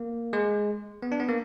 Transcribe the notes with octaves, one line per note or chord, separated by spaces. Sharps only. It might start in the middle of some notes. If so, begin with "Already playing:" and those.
Already playing: A#3
G#3
B3
D4
B3
A#3